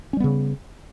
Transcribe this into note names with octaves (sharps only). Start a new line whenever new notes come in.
C#3 G3 B3 C#4